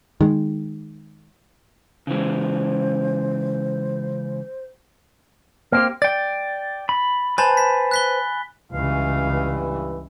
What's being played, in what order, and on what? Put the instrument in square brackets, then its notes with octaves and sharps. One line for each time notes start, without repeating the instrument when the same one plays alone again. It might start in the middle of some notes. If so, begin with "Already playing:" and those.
[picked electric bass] D#3 G#3
[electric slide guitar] C#3 E3 G#3 [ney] C5
[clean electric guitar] A#3 C4 G4 [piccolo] F6
[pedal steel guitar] D5 G5 [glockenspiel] A6
[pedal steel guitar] B5
[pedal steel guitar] B4 C5 A5 [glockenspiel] G#5 B5 A6
[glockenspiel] B6
F#6 B6 G7
[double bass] C#2 C#3 [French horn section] G2 E3 [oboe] F5